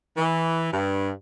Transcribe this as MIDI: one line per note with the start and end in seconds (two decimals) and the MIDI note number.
0.18 0.68 52
0.72 1.11 43